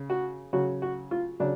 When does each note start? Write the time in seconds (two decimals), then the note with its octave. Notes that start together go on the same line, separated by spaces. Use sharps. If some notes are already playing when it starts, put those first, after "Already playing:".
Already playing: C#3
0.10 F#4
0.53 C#3 F#3 F#4
0.82 F#4
1.11 F4
1.40 C#3 F#3 D4